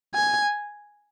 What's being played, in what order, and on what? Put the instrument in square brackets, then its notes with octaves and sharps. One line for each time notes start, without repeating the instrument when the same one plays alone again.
[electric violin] G#5